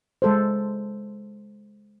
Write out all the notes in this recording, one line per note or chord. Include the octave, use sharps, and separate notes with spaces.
G#3 A4 C5